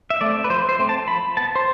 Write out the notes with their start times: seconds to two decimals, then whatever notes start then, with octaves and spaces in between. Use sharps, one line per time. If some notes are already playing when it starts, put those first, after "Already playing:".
0.10 E5
0.21 A3 C4 D5
0.44 B4
0.50 F3 C5
0.69 C5
0.79 A3 C4
0.89 A5
1.07 F3 B5
1.37 B3 A5
1.56 C5